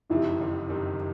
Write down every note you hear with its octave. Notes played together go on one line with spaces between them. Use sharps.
F#1 F2 C3 D#3 E4
F#1 F2 C3 D#3
F#1 F2 C3 D#3